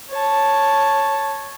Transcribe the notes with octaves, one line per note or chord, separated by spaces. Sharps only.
C#5 A5